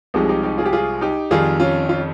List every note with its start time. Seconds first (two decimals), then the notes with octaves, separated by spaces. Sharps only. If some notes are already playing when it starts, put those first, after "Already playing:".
0.14 C2 C3 F3 G#3 D#4 G4
0.22 G#4
0.29 D#4 G4
0.43 D#4 G4
0.58 F4 G#4
0.66 G4
0.73 F4 G#4
1.01 D#4 G4
1.31 F2 D#3 G3 F4 G#4
1.60 C#4 F4
1.89 C#4 F4